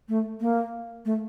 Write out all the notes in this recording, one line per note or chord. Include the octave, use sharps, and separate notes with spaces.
A3
A#3
A3